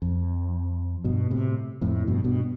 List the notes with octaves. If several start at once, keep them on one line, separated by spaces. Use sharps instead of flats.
F2
G2 B2
A2 C3
F2 A2
G2 B2
G2 B2